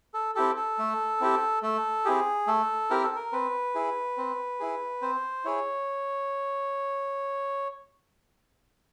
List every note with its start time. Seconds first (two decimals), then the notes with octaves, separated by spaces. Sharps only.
0.14 A4
0.35 C4 E4 G4 A4
0.56 A4
0.79 A3
1.21 C4 E4 G4
1.62 A3 A4
2.05 C4 E4 G4 G#4
2.47 A3 A4
2.90 C4 E4 G4 A#4
3.03 A4
3.16 A#4
3.33 C4 B4
3.75 E4 G#4
4.18 C4
4.60 E4 G#4
5.02 C4 C5
5.45 E4 G#4 C#5